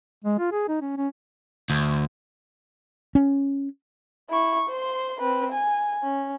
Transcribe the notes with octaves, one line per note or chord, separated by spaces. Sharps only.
G#3
F4
G#4
D#4
C#4
C#4
D2
C#4
E4 C#6
C5 C6
C4 B4
G#5
C#4